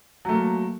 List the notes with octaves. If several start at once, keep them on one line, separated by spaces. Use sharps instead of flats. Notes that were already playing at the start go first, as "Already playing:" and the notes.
F#3 A3 A#3